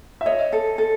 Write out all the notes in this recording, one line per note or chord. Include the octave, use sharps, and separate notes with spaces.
E5
C#5 D#5
A4
A4